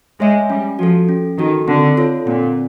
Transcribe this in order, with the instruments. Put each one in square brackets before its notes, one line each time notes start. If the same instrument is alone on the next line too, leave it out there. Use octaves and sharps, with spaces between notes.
[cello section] G#3 [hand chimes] G#4 C#5 E5 G#5
[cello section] G3 [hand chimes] C#4
[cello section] F3 [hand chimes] F#4 A4
[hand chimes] C#4
[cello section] D#3 [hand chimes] F#4 A4
[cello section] D3 [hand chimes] C4
[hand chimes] F4 A4 C#5
[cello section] A#2 [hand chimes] C4